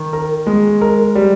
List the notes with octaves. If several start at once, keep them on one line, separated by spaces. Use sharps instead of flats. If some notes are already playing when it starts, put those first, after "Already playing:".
Already playing: D#3
A#4
G#3
A#4
G3